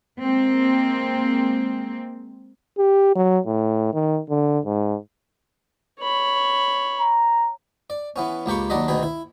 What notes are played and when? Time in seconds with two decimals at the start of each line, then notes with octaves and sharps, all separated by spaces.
0.21 G#3 A#3 C4
2.78 G4
3.15 F#3
3.47 A2
3.93 D#3
4.30 D3
4.65 G#2
6.00 C#5 B5
7.00 A#5
7.90 D5
8.16 E3 B3 C#4
8.46 C#2 A#3 G4 B5 C#6
8.70 D#2 F#3 D4 D5 D#5 B5
8.88 D2 B2 D#3 G#4 B5
9.03 E4